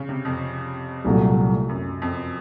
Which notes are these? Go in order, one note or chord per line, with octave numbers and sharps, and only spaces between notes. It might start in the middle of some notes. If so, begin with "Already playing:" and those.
Already playing: C#3
C3
F2
C2 A#2 F#3 A3
F#2
F2